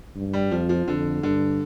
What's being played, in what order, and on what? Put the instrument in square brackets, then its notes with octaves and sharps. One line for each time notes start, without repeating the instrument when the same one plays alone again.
[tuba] G2
[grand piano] G3
[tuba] F2 [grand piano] F3
[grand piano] F3
[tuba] F2 [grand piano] D3
[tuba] G2 [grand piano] D3